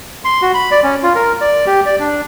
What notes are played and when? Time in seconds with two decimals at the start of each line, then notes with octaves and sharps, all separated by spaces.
0.25 C6
0.42 F#4
0.54 B5
0.71 D5
0.84 C#4
1.03 F4
1.15 A#4
1.41 D5
1.67 G4
1.86 D5
2.00 D4